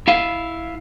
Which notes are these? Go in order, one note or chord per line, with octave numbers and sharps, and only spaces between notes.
E4 F5